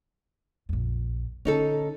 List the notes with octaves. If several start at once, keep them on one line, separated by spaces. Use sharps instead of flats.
A#1 F2
D3 C#4 D#4 A4